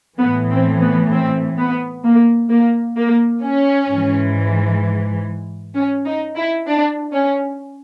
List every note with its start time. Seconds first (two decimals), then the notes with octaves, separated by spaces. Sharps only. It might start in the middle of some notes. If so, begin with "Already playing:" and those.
0.19 A2 E3 B3
0.51 C4
0.82 B3
1.12 C4
1.58 B3
2.04 A#3
2.50 A#3
2.97 A#3
3.43 C#4
3.89 G#2
3.94 E3
5.75 C#4
6.06 D#4
6.36 E4
6.67 D4
7.13 C#4